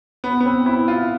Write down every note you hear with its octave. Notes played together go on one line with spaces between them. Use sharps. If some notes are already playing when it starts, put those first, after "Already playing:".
B3
B3
C4
E4
F4